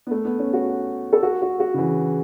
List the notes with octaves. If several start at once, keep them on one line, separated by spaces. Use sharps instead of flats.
B3
A3
B3
C#4
F#4
A4
F#4
F#4
F#4
C#3
E3